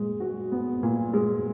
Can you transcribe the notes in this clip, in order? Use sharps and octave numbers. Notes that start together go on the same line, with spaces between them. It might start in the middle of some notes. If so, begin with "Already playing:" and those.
Already playing: A#2 G#3
F#4
B3
A#2
G#3